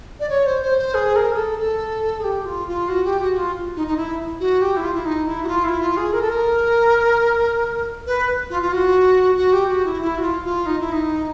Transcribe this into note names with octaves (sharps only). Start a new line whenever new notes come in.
D5
C#5
C5
C5
C5
G#4
A#4
G#4
A4
A4
G#4
G4
F4
F4
F#4
G4
F#4
F4
D#4
D#4
E4
F#4
G4
E4
F4
E4
D#4
E4
F#4
F4
E4
F4
G#4
A#4
A4
A#4
B4
F4
F4
F#4
F#4
G4
F#4
E4
E4
F#4
F4
F4
D#4
E4
D#4